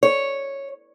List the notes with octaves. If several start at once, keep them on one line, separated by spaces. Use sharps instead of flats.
C#5